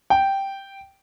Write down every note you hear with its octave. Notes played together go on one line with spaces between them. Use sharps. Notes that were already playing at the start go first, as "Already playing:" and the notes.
G5